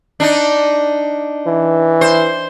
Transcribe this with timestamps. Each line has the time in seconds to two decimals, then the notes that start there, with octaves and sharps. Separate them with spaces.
0.20 D4 D#4
1.47 E3
2.01 C5